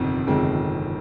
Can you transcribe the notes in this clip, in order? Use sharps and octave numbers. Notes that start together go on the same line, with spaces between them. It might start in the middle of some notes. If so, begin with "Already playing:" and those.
Already playing: G1 F2 C3 D#3
G1 F2 C3 D#3 G#3